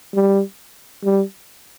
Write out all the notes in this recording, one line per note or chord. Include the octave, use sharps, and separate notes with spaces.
G3
G3